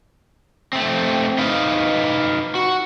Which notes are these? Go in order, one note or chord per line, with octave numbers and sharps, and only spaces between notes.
A3 C4
D#4 B4 F5
F#4